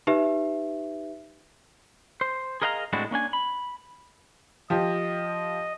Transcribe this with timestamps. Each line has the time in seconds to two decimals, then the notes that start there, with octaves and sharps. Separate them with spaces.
0.07 D#4 G4 B4 E5
2.21 C5
2.62 G#4 A#4 D#5 F5 F#5 A#5
2.93 A2 G#3 C4 D4 E4 F#4
3.11 A#3 C#4 D4 G#5
3.33 B5
4.70 F3 G4 D#5